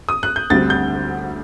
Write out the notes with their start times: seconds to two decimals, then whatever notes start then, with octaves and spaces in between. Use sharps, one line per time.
0.09 D#6
0.23 F#6
0.36 G6
0.50 D2 D3 G3 C4 A6
0.70 G6